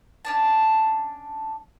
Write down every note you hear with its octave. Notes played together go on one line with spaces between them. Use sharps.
C#4 D4 A5